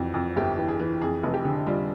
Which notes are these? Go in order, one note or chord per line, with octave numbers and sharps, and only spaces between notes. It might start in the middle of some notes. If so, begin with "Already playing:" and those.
Already playing: F2 E3 F#4
F2
G1 G4
E3
G#4
E3
F2 G#4
F1
G4
D3
G3 F4